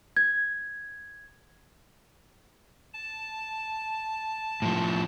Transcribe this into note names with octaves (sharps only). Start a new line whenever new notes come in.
G#6
A5
A2 F3